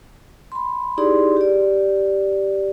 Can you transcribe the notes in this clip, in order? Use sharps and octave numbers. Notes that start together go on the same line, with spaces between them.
B5 C6
D#4 E4 G4 G#4 D5 C6
G4 D5